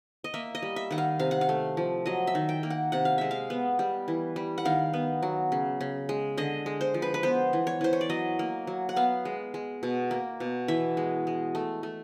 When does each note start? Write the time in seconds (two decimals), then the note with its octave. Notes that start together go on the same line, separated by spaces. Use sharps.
0.24 D#5
0.34 A#3 E5
0.55 D#5
0.62 G3
0.76 E5
0.91 D#3 F#5
0.98 F5
1.19 C3 F5
1.31 F#5
1.41 F5
1.49 A3
1.77 F3
2.06 F#3 D#5
2.27 E5
2.35 D#3
2.49 G5
2.63 A#3
2.70 F#5
2.92 C3 F#5
3.05 F5
3.18 G#3 E5
3.31 F5
3.50 B3
3.79 G3
4.08 E3
4.36 G3
4.58 F#5
4.65 D#3 F5
4.93 B3
5.22 F#3
5.52 C#3
5.81 C#3
6.09 G#3
6.37 D3 D#5
6.66 G#3
6.81 C5
6.94 F3
7.02 B4
7.14 B4
7.23 B3 C5
7.53 E3
7.67 C#5
7.81 E3 C5
7.93 C#5
8.01 D5
8.09 F#3 D#5
8.39 A#3
8.67 F#3
8.89 F#5
8.96 B3 F5
9.25 G#3
9.54 G#3
9.83 B2
10.11 A#3
10.40 B2
10.68 E3 E5
10.97 G#3
11.27 G#3
11.55 A3
11.83 A3